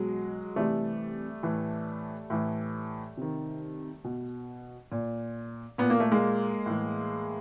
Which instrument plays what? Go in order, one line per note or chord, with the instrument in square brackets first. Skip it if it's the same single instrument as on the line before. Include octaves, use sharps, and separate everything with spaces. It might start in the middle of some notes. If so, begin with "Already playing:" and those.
Already playing: [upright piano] B2 F#3 G#3
C3 E3 G3 A3
A2 E3
A2 E3
C3 D#3
B2
A#2
A#2 B3
A#3
A3
G#3 A#3
A2 E3